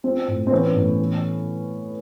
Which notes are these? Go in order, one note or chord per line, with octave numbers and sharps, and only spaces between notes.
F3 C4
A2
C4
E3 B3 C#4
A2
E3